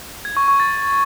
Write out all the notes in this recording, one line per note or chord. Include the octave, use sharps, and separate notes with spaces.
G#6
C#6
C#6
A6